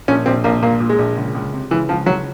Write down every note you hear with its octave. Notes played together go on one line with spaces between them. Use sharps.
A#1 C#4
A#1 C4
A#1 A#3
A#2 A#3
A#2
G#3
A#1
C#2
C#2
C3
C#2 E3
C#2 F3
C#2 F#3